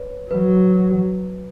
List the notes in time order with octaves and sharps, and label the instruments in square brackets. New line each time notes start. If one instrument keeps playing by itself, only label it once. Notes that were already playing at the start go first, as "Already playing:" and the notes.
Already playing: [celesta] B4 C#5
[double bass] F#3 [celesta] B4